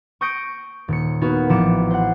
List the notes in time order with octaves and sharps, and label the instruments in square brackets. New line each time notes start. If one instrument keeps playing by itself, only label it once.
[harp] C#6 D#6 G6 A#6 C#7 D7
D#1 C#7
A#3 B3 D#4 F#4
A1 F3 D6 C#7 E7
C5 F#5